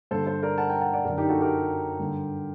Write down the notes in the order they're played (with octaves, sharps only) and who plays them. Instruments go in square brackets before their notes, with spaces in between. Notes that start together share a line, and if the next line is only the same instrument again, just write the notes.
[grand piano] G2 D3 A4 C5
A4 C5
A#4 D5
F#5 A5
G5 A#5
F#5 A5
D5 F#5
F#2 D3 A#4 D5
D#4 G4
F#4 A4
G4 A#4
G2 D3